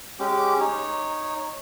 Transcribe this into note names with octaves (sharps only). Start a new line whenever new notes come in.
G#3 C#4 G4 D6
D#4 C#5